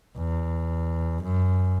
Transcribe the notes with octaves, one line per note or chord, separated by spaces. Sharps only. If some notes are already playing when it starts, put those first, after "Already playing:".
E2
F#2